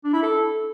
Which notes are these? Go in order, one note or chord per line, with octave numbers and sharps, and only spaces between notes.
D4
E4
A4